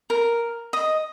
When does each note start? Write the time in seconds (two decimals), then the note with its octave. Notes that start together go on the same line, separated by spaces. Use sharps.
0.10 A#4
0.73 D#5